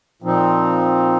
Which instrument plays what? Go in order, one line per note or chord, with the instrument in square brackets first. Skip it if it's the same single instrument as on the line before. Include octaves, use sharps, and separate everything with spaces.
[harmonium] A#2 F3 C4 D#4